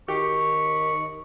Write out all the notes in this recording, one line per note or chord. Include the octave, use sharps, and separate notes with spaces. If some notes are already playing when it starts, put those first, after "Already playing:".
D#3 G4 C#6